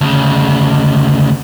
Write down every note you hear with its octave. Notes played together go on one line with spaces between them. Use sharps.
D2 C#3